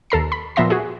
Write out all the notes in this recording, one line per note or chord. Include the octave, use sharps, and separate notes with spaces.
D#2 A4 A#5 C7
B5
A#2 F3 B3 E5 C6 A#6
F#4 G#4